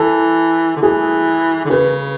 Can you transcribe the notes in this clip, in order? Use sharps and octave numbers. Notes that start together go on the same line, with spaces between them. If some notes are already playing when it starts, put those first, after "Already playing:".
Already playing: E3 A4
D3
E3 G#4
D3
C#3 B4